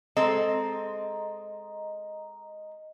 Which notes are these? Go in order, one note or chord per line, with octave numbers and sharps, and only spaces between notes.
G#3 C4 A4 D#5 A#5